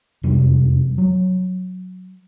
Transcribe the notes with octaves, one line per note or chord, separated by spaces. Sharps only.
E1 F2 C3 G3
F#3